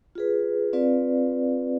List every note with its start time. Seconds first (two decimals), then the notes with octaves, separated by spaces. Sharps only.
0.15 F4 G#4 B4
0.73 C4 F4 B4 D5 F5